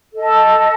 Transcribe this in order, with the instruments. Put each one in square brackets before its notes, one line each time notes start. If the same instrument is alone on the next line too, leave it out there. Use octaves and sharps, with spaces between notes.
[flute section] A4 D#5 A5